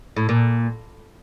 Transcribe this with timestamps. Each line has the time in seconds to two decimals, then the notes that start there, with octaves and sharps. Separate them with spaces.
0.17 A2
0.29 A#2